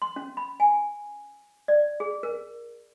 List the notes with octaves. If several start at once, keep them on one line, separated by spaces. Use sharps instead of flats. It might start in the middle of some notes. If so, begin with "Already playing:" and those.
C6
C#4
B5
G#5
D5
G#4
A#4